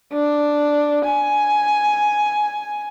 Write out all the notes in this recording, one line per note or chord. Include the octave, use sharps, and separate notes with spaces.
D4
G#5